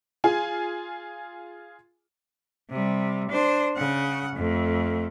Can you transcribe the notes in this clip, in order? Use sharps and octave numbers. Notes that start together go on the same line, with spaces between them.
F4 G#4 G#5
C3 G3
D4 C5
C#3 F#5
F2 A3